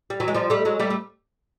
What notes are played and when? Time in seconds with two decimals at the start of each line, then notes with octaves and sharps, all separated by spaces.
0.10 G3
0.20 E3 F#3
0.28 G#3
0.34 F3 G3
0.50 G3 A3
0.65 F#3 G#3
0.80 G3 A3
0.90 A3